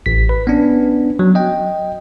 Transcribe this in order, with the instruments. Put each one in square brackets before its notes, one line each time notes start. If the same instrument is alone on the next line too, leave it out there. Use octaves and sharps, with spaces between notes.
[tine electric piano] A1 B6
B4
B3 C#4 D4
F#3
D#5 G5